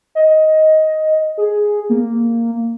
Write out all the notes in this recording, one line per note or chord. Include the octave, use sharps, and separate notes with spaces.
D#5
G#4
A#3